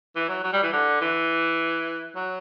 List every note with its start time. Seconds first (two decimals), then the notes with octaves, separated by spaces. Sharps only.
0.15 E3
0.29 F#3
0.44 F#3
0.53 G3
0.63 E3
0.72 D3
1.01 E3
2.16 F#3